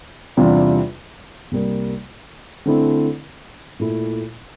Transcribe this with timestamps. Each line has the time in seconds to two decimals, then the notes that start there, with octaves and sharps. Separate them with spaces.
0.37 E2 C3 G3 D4 F4
1.52 C2 C3 G3 A#3
2.66 D3 A3 C4 E4
3.79 A#2 A3 E4